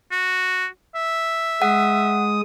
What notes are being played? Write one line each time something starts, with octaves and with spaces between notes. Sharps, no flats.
F#4
E5
G#3 F#5 D#6